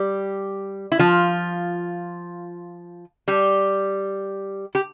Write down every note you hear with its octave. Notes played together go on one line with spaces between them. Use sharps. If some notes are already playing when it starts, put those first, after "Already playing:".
Already playing: G3 G4
E4
F3 F4
G3 G4
G4